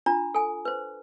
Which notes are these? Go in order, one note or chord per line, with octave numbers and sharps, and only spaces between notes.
D4 F4 A#5
A4 G#5
B4 C5